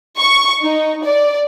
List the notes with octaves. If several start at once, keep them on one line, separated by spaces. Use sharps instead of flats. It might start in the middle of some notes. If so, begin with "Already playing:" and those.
C#6
D#4
D5